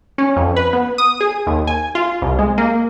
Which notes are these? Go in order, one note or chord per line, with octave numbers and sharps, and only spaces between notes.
C#4
F2
B4
B3
D#6
G#4
D#2
G#5
F4
C2
G#3
A#3